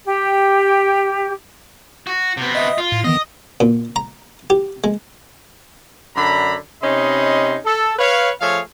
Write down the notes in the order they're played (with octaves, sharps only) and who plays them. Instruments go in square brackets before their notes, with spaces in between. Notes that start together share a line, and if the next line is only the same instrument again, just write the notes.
[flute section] G4
[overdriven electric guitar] F#4
C3 B3
[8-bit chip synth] D#5 E5 D#6
[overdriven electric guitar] F4
[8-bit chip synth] A2
[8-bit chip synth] D#3 E3 B3 [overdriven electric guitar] D#5
[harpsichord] A#2
A#5
G4
G#3
[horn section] F#2 D3 D4 A#5 B5
C3 C#4 D#4 D#5 B5 C6
A4
B4 C#5 F5
F3 A3 G#4 C#5 F5